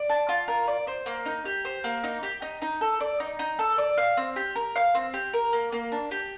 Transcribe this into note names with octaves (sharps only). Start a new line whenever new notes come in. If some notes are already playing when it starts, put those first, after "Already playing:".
Already playing: D5
A5
F4
A#4
D5
C5
A#3
D#4
G4
C5
A#3
D#4
G4
D#4
D#4
A4
D5
D#4
D#4
A4
D5
F5
C4
G4
A#4
F5
C4
G4
A#4
A#3
A#3
D4
G4